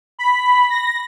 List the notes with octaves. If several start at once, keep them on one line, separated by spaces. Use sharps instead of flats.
B5
A#6